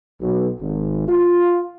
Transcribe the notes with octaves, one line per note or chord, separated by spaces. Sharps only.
B1
G#1
F4